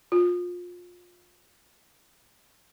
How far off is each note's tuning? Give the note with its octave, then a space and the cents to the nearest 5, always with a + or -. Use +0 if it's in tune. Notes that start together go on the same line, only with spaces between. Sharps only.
F4 +25